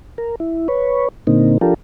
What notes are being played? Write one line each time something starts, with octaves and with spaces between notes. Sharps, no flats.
A#4
E4
B4 C#5
A#2 D3 A#3 C4 D#4
F3 D4 F4 G4 A4 A#4